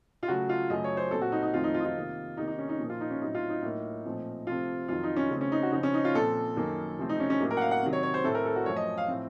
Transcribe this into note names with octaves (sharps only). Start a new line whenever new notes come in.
F4
C#3 F#3 A3 F#4
F4
F#2 C#3 F#3 A3 D#5
C#5
C5
A#2 F#3 C4 A4
F#4
D#4
D#4
F2 D#3 F#3 A3 C4 F4
D#4
F4
D#4
F4
C3 D#3 A#3
C3 D#3 A#3 D#4
D#4
C#4
D#4
A#2 F3 A#3
F4
D#4
C#4
A2 F#3 C4 D#4
F4
D#4
A2 F#3 A#3
A#2 F3 A3 C4
C3 F3 A3 C4 F4
F2 D#3 F#3 F4
D#4
C#4
C#3 A3 C4
C#4
D#4
F#4
C#3 F3 C4 D#4
C#4
D#4
F4
A#2 F3 C4 A4
F#2 D#3 A#3
C3 F3 A3 C4
D#4
C#4
C#4
A2 F#3 A#3
A#4
F#5
F5
F#5
C3 D#3 F#3
C#5
C#5
C5
A2 A3 C4 A4
A#4
A4
F#4
F#2 F3 A3 C#5
D#5
F5
A2 F3 C4